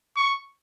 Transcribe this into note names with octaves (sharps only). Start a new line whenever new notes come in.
C#6